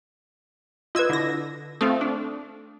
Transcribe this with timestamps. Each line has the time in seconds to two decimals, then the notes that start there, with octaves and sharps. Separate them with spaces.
0.95 F4 B4 D#5 E6 G#6
1.10 D3 E4 A#6
1.81 A3 C4 F4 D#6
2.01 D4